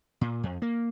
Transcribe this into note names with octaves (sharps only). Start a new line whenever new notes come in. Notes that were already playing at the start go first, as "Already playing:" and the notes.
A#2
F2
A#3